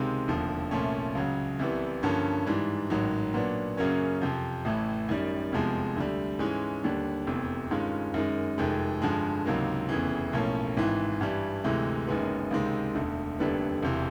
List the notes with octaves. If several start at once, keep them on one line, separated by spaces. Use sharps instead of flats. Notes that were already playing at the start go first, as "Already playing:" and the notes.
Already playing: C#2 C3 D#3 G#3 C4
E1 D#2 D3 F3
C2 A#2 F3 A3 C#4
C#2 C#3 F#3
C2 C3 E3 G3 B3
G2 D3 F3 A#3 C#4
G#2 E3 G3
A1 G#2 D#3 F#3
A#2 F#3 B3 D4
F#2 C#3 F#3 A#3 C#4
F2 C3 F3
A1 A2 E3 A3
F#2 D#3 G3
F1 E2 C3 F3 G#3
D2 D3 G3
G#2 E3 G#3 C#4
D#2 D3 G3
F1 E2 C3
G2 D#3 G#3 C#4 F4
F#2 D#3 G#3
F1 F2 C3 D#3 G#3
G2 D3 F3 G#3
C#2 C3 D#3 F#3 A#3
F1 E2 C#3 E3
B1 A2 F3 A#3 C#4
G#1 G#2 E3
G2 E3 G3
D2 C3 E3 G#3
F#1 F#2 D#3 G#3 B3
C#2 C3 D#3 G#3 C4
E1 D2 D3
F1 D#2 D3 G3 B3
E1 E2 C3 E3